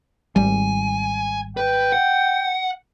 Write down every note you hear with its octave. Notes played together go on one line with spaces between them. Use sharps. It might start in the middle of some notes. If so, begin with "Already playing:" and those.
G#1 G3 G#5
B4 G5
F#5